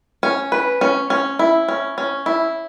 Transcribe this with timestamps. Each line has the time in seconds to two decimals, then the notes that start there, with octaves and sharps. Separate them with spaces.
0.23 C#4
0.52 B4
0.81 C#4
1.10 C#4
1.39 E4
1.68 C#4
1.98 C#4
2.26 E4